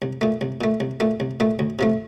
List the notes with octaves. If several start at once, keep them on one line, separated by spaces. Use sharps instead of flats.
C2
A#2 A3
C2
A#2 A3
C2
A#2 A3
C2
A#2 A3
D2
C3 F3 A3